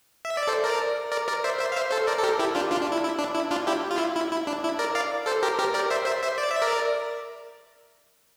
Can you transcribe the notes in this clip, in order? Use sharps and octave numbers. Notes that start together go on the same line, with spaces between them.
E5
D5
A4 C5
A#4 D5
A#4 D5
A#4 D5
C5 E5
C5 E5
F5
C5 E5
A4 C5
A#4 D5
A4
G4 A#4
E4 G4
D4 F4
D4 F4
D4
E4
E4
D4
E4
D4 F4
E4 G4
F4
E4
E4
E4
D4
E4
A#4 D5
D5 F5
A4 C5
G4 A#4
G4 A#4
A#4 D5
C5 E5
C5 E5
C5 E5
D5
E5
A#4 D5